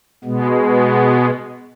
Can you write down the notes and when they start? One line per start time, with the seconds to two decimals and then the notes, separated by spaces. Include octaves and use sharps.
0.24 B2 G#3 B3
0.57 B3